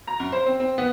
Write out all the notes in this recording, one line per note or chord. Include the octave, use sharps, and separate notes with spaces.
A#5
F#2
C5
C4
C4
B3